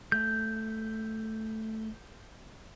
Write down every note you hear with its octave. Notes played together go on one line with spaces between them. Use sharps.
A3 G6